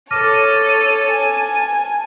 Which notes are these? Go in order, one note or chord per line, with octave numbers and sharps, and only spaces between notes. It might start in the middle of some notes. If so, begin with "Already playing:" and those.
A4 C#5 A5 D6 F6 A#6 D#7
G#5